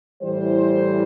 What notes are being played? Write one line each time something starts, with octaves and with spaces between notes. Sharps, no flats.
A2 E3 G3 C5